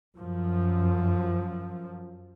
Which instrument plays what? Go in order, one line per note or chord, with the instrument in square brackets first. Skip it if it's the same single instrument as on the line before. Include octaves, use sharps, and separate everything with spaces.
[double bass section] F#2 F3